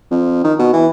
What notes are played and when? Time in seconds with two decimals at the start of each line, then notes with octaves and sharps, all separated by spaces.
0.11 F2
0.44 D#3
0.59 B2
0.73 E3